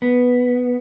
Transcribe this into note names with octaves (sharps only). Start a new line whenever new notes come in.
B3